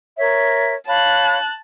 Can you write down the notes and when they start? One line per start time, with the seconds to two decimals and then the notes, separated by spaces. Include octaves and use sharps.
0.18 A#4 C#5 E5
0.87 C#5 F5 A5 B5 F#6